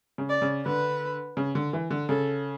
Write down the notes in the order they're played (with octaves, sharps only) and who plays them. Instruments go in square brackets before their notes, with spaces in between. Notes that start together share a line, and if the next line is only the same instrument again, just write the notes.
[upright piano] C#3
[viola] D5
[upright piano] C#3
[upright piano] D3 [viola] B4
[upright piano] C#3
D3
E3
D3
[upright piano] C#3 [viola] A4